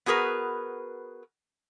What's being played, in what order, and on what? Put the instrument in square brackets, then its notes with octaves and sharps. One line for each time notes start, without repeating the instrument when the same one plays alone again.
[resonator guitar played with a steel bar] B3 F#4 G#4 A#4 B4